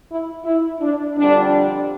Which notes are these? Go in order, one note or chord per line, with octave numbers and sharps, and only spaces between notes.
E4
E4
D4
F2 D3 G3 D4